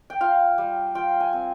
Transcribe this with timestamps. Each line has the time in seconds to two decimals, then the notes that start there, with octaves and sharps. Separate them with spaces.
0.10 G5
0.21 F4 F5
0.58 G3
0.95 F4 G5
1.20 G#5
1.33 C4